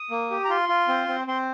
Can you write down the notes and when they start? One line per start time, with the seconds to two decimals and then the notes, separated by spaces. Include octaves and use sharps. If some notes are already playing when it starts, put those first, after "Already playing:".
Already playing: D#6
0.11 A#3
0.31 G4
0.45 A#5
0.49 F4 C6
0.69 F4
0.88 C4
1.08 C4
1.27 C4 C6